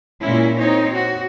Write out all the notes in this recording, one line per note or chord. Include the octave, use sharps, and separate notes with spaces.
A#2 G#3 C#4 E4
C4 D#4 C#5
F#4